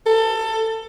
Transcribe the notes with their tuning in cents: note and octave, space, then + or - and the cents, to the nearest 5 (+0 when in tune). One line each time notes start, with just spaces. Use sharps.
A4 +25